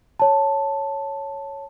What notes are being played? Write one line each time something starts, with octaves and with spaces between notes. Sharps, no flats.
C#5 A5